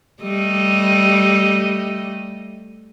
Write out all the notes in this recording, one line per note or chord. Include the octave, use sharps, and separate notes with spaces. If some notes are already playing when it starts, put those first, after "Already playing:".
G3 A3 D#5